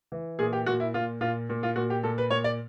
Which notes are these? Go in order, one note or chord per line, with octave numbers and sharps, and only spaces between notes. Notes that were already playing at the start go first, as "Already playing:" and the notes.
E3
A#2 G#4
G4
A#2 F#4
E4
A#2 F4
A#2 F4
A#2
F4
A#2 F#4
G4
A#2 A4
B4
A#2 C#5
D5